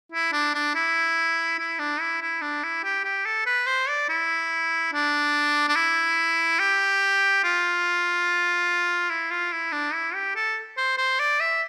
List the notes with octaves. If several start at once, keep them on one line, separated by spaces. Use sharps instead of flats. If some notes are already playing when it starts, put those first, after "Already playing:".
E4
D4
D4
E4
E4
D4
E4
E4
D4
E4
G4
G4
A4
B4
C5
D5
E4
D4
D4
E4
G4
F4
E4
F4
E4
D4
E4
G4
A4
C5
C5
D5
E5